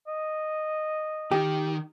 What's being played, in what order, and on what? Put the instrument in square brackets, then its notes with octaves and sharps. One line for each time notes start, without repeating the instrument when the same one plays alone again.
[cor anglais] D#5
[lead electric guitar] D#3 [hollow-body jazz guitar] G4